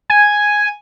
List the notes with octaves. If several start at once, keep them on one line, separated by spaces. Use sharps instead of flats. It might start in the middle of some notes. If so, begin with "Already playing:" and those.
G#5